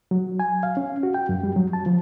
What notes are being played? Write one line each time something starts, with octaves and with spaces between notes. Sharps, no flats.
F#3
G#5
F5
C#4
F#4
G5
F#2
G3
F#3
A5
F3